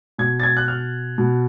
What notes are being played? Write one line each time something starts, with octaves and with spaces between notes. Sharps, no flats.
B2 G#6
A6
G#6
F#6
F6
B2